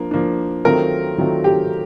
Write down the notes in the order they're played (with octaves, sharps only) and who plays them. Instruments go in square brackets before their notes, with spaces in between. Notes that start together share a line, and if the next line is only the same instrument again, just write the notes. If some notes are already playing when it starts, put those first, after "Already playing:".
Already playing: [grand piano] F3 A#3 D4
F3 A#3 D4
[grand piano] D#3 F#3 A3 C4 F4 [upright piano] A#4
[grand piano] D#3 F#3 A3 C4 F4
[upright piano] G4